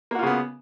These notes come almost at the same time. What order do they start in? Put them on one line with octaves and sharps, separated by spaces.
A#3 F#4 F4 C#3 B3